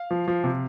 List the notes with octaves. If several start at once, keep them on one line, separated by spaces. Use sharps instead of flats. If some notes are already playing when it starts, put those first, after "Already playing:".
Already playing: F5
F3
F3
C3